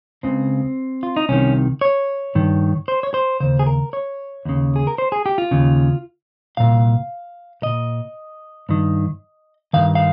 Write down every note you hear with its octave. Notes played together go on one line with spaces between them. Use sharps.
C#2 C#3 C4
F4
D#4
C2 C3 D#3 C#4
C#5
G2 D#3
C5
C#5
C5
D#2 C#3 C5
G#4
A#4
C#5
D#2 C#3
G#4
A#4
C5
G#4
G4
F4
D#2 C#3
C2 A#2 F5
C2 A#2 D#5
G2 D#3
G2 D#3 F5
F5